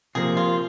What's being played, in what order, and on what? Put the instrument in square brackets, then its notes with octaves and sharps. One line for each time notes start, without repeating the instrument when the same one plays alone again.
[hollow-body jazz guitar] C3 F3 A#3 [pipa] G#4
[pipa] F4